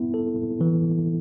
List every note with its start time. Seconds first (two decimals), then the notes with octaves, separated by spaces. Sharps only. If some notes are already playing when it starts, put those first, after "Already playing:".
Already playing: B3 E4
0.14 A4
0.61 E3